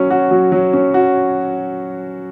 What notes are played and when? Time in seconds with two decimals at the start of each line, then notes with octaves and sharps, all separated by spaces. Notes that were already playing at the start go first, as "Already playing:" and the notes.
Already playing: F#3 C#4
0.11 F#4
0.31 F#3
0.52 F#3
0.73 C#4
0.94 F#4